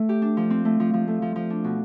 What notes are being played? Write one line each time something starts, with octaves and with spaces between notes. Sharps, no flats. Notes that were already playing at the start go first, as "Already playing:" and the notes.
Already playing: A3
G4
D4
F3
C4
A3
F3
F3
A3
F3
F3
D4
B2